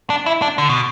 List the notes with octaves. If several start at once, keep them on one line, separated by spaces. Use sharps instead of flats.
D4
E4
D4
D3
B2